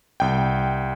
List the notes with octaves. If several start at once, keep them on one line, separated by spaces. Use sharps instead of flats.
C2 G5